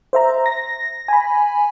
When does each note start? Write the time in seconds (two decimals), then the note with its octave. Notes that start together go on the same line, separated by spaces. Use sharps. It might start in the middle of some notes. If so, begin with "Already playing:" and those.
0.13 C5 E5 A#5
0.46 A#6
1.08 G#5 B5